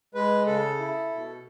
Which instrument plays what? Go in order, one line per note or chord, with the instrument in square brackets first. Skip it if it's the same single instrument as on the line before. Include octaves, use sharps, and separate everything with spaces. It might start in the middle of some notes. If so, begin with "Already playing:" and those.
[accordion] G#3 B4
C#3 A4
E4
B2